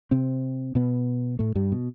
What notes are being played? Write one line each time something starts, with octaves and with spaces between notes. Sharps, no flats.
C3 C4
B2 B3
A2 A3
G2 G3
B2